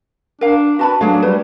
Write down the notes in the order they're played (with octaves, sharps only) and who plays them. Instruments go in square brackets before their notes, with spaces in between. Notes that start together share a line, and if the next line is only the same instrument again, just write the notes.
[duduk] D4 [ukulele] A#4 F5
[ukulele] F#4 A5 B5 [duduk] B4
[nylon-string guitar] F#3 A3 [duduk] D4 [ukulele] G#4 C#5 F5
[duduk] G3 [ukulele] B4